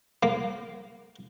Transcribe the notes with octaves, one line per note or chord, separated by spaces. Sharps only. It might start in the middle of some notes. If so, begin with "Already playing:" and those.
A#3